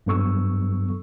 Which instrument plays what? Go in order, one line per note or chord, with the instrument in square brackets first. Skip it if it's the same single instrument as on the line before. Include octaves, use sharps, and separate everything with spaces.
[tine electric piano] G2 F#3 B3 A4 C#6 E6